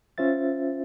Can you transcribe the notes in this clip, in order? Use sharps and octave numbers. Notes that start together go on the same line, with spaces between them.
C#4 F4 C5 E5 A6